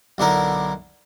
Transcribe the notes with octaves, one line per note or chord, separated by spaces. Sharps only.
B1 D3 E4 A#4